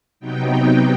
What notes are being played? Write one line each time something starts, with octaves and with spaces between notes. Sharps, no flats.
C3 F#3 B3 D#4 G5